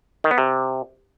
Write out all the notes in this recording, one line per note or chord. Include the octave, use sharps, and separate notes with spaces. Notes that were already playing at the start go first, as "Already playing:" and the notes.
D#3
B3
C3